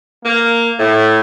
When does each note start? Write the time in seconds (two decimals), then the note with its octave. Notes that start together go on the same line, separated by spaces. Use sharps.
0.24 A#3
0.79 A2